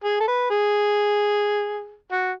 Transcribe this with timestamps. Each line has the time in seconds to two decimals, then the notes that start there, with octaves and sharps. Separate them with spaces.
0.04 G#4
0.20 A4
0.28 B4
0.50 G#4
2.11 F#4